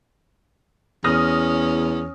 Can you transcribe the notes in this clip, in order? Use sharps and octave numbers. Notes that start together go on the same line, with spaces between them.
E2 C#4 D#6 F6 A#6